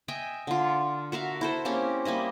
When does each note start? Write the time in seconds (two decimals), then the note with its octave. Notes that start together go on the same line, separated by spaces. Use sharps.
0.08 D#5 E5 G5 G#5
0.47 D3 F4
1.12 F#4 A#4 E5 F5
1.41 E4 A4 C5
1.65 A#3 C4 C#4 G4
2.05 G3 A#3 E4 D#5